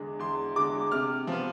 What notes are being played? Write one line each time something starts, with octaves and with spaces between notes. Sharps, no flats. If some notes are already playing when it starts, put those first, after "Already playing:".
Already playing: E2 D3 G#3
E2 C6
D3 G#3 D6
C3 F6
F3 B3